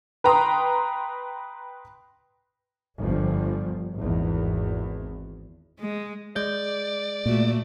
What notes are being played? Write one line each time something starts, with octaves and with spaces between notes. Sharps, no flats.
B4 G5 A#5 C6 D#6
G1 G2 F3
G#1 E2
G#3
G#3 D5 G6
A#2 A3 F#4